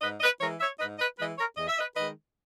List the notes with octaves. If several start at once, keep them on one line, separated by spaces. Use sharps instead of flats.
G#2 B4 D#5
B4 D#5
E3 G#3 A#4 C#5
C#5 E5
G#2 B4 D#5
B4 D#5
E3 G#3 B4 D#5
A#4 C#5
E2 D#5
E5
B4 D#5
D#3 G#3 B4 D#5